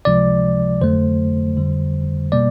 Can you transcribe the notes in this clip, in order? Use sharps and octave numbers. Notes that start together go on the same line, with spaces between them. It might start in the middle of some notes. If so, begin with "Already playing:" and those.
C#2 C3 F3 G#3 D5
F2 D3 F#3 A3 C5
F2 D3 G3
B2 G3 A#3 D5